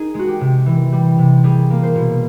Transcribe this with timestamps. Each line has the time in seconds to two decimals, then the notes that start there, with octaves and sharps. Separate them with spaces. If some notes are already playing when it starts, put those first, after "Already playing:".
Already playing: D#4 G#4
0.14 G#3 F#4
0.28 G4
0.41 C3
0.66 E3
0.92 G3
1.18 C3
1.44 G3 G#4
1.70 A#3
1.83 C5
1.95 B2